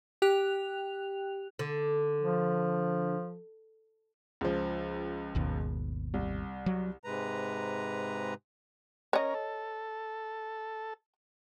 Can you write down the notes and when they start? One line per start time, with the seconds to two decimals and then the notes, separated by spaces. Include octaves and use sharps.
0.22 G4 G5 F#6 F7
1.59 D3
2.20 F3
4.41 C#2 F3
5.35 G#1 D#2 B2
6.14 C2
6.66 F#3
7.04 G#2 C3 G#3 B4 A#5
9.13 C#4 A#4 C#5 D#5
9.34 A4